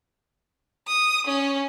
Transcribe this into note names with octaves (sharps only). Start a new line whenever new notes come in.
D#6
C#4